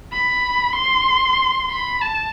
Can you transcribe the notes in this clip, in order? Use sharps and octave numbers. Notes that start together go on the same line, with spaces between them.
B5
C6
B5
A5